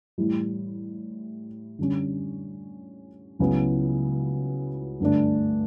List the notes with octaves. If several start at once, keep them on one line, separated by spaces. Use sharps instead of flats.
A2 E3 G3
D3 G3 C#4
C#2 C#3 F#3 B3 E4
G2 D3 A3 D4